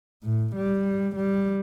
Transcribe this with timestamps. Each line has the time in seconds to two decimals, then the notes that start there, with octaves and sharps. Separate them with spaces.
0.23 A2
0.55 G3
1.16 G3